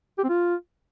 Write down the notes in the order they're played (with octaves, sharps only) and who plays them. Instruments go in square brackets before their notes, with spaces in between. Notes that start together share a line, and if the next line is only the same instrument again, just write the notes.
[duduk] G4
C4
F4